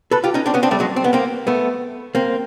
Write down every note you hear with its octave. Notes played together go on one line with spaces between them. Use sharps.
A4 B4
F4 G4
C#4 D#4
C4 D4
B3 C#4
C4 D4
G3 A3
F#3 G#3
C4
B3
A#3 C4
A3 B3
A#3 C4